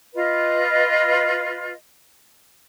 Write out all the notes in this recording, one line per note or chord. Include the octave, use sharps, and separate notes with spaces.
F4 B4 D#5